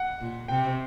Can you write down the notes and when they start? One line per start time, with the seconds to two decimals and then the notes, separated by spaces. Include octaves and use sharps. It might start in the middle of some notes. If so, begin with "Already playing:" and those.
Already playing: F#5
0.21 A#2
0.48 C3 G5